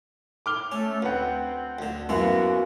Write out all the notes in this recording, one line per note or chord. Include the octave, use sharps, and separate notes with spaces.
D6 F6 G7
A3 C#4
D2 C4 B4 F#5
D2 D3
F#2 E3 A#3 B3 F#4